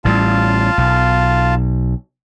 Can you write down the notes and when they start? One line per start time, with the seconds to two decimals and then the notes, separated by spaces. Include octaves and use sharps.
0.05 A1 A2 G3 F4 F5 A5
0.78 B1